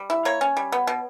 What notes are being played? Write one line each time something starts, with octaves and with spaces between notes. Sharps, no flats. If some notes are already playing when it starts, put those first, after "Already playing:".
Already playing: G3
E4
A#3 C#5
C#4
G3
B3
B2